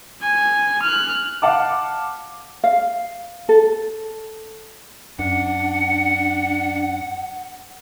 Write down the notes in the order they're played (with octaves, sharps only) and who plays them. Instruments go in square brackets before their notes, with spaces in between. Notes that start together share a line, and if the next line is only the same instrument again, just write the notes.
[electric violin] G#5
F6 F#6
[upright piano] F5 F#5 A5 D6
[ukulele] F5
A4
[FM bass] F#2 [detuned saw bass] D4 [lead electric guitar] F#5 [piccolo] C#7